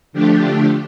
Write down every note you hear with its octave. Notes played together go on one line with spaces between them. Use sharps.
D3 F3 A3 D4 G4